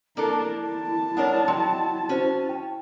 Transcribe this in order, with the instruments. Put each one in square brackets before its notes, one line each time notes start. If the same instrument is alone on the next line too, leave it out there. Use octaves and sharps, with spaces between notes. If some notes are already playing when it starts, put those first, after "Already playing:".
[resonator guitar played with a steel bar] A#3 D4 A4 [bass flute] E4 [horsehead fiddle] A#4 A5
[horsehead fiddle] A5
[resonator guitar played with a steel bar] G#3 D4 A#4 [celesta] C#5 F#5
[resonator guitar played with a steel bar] F#3 [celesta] D#5 G5 C6
[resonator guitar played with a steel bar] C#4 [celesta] F#4 C5
[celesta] G5